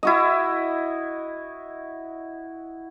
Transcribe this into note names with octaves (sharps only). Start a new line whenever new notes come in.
E4 F#4 D#5